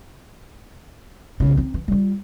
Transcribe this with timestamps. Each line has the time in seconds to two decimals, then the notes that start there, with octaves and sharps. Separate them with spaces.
1.40 B1 C#3
1.57 C4 D#4
1.74 E3
1.88 G3 F4